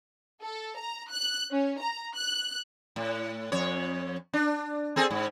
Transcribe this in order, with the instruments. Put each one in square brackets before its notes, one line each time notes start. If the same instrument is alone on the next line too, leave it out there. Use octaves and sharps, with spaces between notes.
[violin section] A4
A#5
F#6
C#4
A#5
F#6
[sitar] A2
F2 C#5
D4
C4 G#4 A4
G#2